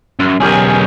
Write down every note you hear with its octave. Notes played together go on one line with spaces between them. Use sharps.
F#2
B1 C#4 G4 G#4 A#4